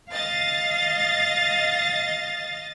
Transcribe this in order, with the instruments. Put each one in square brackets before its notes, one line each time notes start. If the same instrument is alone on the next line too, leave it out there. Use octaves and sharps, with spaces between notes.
[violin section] D#5 A6 [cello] F5